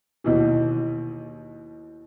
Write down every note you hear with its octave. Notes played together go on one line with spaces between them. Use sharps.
D#2 B2 E3